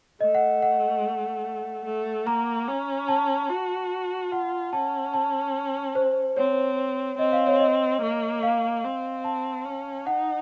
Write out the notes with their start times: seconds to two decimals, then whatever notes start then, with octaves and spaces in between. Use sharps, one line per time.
0.21 A3 D#5
0.35 F#5
0.62 F#5
1.85 A3
2.26 A#3 A#5
2.68 C#4
3.08 A5
3.49 F#4
4.32 F4 F#5
4.73 C#4 A5
5.14 A5
5.95 C5
6.37 C4 C#5
7.19 C4 D#5
7.32 F5
7.47 C#5
7.60 D#5
8.02 A#3
8.43 F5
8.84 C4
9.24 A5
9.66 C#4
10.06 D#4 F#5